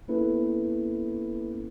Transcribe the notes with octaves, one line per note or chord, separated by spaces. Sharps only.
A#3 B3 C#4 E4 A4 B4